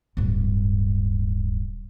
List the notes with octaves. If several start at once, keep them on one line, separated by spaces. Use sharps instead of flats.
D1 G2